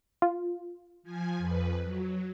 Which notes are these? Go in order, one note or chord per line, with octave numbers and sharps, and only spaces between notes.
F4
F3 G#5
F2 B4
F#3